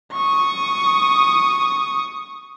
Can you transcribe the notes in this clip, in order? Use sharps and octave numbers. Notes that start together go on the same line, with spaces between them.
C#6 D#6